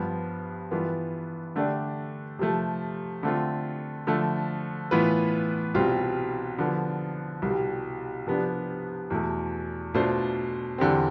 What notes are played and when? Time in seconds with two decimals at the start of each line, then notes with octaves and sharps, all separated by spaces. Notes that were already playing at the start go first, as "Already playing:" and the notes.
Already playing: G2 F3 B3
0.71 G2 E3 B3 F4
1.56 D3 A3 D4 G4 D5
2.39 C3 F3 A3
3.23 D3 A3 C4 F4
4.07 D3 F3 A3
4.91 A2 E3 B3 F4 B4
5.74 C2 B2 G3 C4 F4
6.59 D3 F3 B3
7.42 C2 B2 G3
8.27 C3 F3 B3 D4
9.10 E2 B2 A3
9.94 B2 A3 D4 F4 C5
10.78 E2 D3 G3 C4